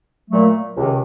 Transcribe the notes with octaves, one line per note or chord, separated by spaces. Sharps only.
A#2 F#3 A3
C#2 C3 D#3